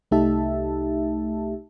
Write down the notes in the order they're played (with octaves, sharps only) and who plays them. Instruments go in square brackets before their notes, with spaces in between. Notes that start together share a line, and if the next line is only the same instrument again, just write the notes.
[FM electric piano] C2 A3 D#4 G4 E5 A5